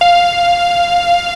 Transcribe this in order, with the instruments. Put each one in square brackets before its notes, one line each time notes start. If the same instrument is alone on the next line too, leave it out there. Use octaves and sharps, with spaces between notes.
[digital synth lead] F5